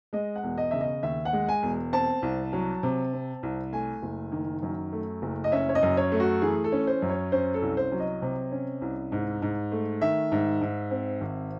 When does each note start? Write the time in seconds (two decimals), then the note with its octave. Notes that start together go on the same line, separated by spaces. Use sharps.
0.13 G#3 D#5
0.36 F#5
0.43 E1
0.58 D#5
0.71 C#3 E5
0.81 D#5
1.03 D#2 E5
1.25 F#5
1.33 G#3
1.49 G#5
1.63 E1
1.93 C4 A5
2.22 C2
2.53 F#3
2.83 C3
3.13 C4
3.43 C2
3.73 A3 G#5
4.03 F#1
4.32 D#3
4.63 F#2
4.92 A3
5.22 F#1
5.44 D#5
5.52 C#4 E5
5.69 C#5
5.75 D#5
5.83 F#2
5.97 C#5
6.12 A3
6.20 F#4
6.42 E3 G#4
6.64 A4
6.72 C#4
6.87 C5
7.02 F#2
7.10 C#5
7.32 C#4 C5
7.54 A4
7.62 C2
7.77 C5
7.92 F#3
8.00 D#5
8.22 C3
8.52 C#4
8.82 C2
9.12 G#2
9.42 G#2
9.72 A3
10.02 D#3 E5
10.32 G#2
10.61 G#2
10.91 C4
11.21 G#1